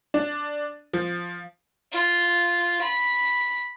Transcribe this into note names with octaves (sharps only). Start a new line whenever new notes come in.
D4
F3
F4
B5